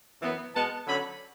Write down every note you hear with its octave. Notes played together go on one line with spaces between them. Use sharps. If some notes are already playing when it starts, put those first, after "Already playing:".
F#2 E3 B3
B2 G#3 B3 A5
D3 F#3 C#4 B5